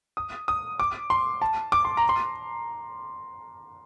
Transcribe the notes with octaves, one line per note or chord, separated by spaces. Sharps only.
D#6
D#6
D6
C6
A5
D6
C6
A#5
C6